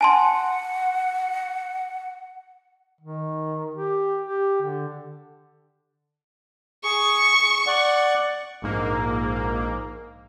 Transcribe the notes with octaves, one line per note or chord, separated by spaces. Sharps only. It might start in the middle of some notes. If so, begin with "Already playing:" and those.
F#5 G#5 A5 C6
D#3
G4
G4
D3
G#4 C#6
D5 F#5
A#1 G#2 A#3